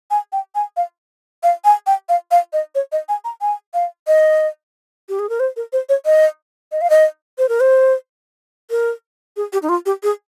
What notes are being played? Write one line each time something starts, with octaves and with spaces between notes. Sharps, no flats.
G#5
G5
G#5
F5
F5
G#5
G5
F5
F5
D#5
C#5
D#5
G#5
A#5
G#5
F5
D#5
G4
G#4
A#4
C5
A#4
C5
C#5
D#5
D#5
F5
D#5
C5
A#4
C5
A#4
G#4
G4
D#4
F4
G4
G#4